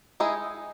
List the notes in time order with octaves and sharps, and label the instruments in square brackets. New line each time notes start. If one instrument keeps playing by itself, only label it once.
[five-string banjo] G#3 D#4 E4 G#4